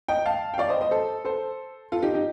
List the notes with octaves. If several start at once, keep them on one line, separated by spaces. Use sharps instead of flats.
D#5 G5
F5 A5
G5
D5 F5
C5 D#5
C5 D#5
A4 C5
A4 C5
F4 A4
D#4 G4
D#4 G4